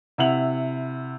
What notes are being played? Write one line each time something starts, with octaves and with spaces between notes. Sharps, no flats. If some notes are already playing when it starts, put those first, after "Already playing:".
C3 E4 E5 F#5 F7 F#7